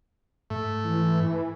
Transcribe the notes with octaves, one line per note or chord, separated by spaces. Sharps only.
G#2 A3
E3